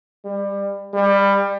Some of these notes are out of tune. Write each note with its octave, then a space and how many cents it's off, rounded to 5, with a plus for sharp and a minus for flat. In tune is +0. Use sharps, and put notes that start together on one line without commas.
G3 +25
G3 +20